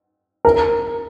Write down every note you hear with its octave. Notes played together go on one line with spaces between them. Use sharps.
A#4